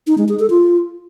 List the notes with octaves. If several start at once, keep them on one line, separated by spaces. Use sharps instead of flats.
D#4
G#3
G#4
A4
F4